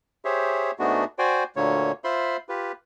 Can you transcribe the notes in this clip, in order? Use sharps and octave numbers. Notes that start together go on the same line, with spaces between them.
G4 G#4 C5 C#5 E5
G#2 G#3 A3 B3 D4 F#4
F#4 C5 D5 G5 G#5
D2 A#2 D3 A#3 C#5
F4 C5 E5 B5 C6
F4 G4 B4